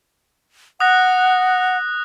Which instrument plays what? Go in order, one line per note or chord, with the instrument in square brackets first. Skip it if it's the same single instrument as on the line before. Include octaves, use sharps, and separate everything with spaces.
[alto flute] F#5 [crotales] D#6 F#6 A#6